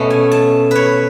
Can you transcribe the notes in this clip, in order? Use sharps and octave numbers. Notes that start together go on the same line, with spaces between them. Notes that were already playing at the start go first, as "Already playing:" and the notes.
Already playing: B2 A3 C#4
G#5
A5
B4 C#5